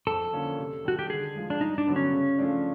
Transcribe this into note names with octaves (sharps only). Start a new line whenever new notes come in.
F2 A4
D3 F3 A#3 C#4
C3
D#3 G3 F#4
G4
D3 G#4
F3 G#3
D4
G2 D#4
D4
D3 F#3 B3
C#4
C#3
F3 A3 D4